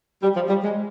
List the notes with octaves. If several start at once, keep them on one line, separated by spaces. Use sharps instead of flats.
G3
F3
G3
G#3